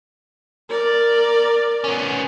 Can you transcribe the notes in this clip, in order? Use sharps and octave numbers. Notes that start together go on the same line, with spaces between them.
A#4 D5
B3 C#4